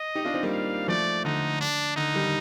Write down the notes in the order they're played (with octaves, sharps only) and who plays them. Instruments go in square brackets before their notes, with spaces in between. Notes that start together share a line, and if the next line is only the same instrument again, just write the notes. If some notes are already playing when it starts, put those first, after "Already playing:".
Already playing: [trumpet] D#5
[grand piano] D#4 G4
D4 F4
C4 D#4
G3 A#3
[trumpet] F5
[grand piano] F3 A3 [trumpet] D5
[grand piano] D3 [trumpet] D#4
[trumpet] D4
[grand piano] D3 [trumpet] D#4
[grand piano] D#3 G3